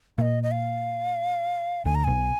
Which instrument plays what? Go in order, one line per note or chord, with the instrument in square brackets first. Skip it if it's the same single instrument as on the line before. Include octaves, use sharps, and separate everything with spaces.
[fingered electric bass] A#2 A#3 [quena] D#5 F5
[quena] D#5
F5
[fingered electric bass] D2 D3 [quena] G#5
[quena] A#5
[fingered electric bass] B1 B2 [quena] G#5